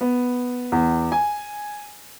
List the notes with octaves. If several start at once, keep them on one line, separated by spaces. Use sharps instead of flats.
B3
E2
G#5